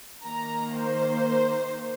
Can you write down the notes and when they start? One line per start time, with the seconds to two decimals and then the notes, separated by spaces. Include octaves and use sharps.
0.22 D#3 A#3 A#5
0.77 C5